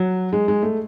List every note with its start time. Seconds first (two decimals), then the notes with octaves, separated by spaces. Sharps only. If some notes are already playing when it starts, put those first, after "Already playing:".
Already playing: F#3
0.33 G#3
0.48 G#3
0.63 A3